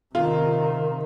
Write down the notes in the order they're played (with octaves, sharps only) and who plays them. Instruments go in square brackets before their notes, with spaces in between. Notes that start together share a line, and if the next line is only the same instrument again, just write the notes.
[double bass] C3 D#3 [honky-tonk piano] F4